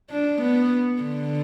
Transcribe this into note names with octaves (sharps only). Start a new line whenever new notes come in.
D4
B3
D3